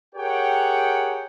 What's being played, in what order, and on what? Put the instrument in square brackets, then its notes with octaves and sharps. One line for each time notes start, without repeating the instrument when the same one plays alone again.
[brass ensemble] G4 G#4 A#4 C#5 F#5 G5